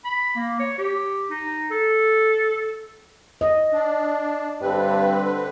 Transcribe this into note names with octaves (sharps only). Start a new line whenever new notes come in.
B5
A#3
C#5
G4
D#4
A4
D#5
D4
G2 D3 C4 B4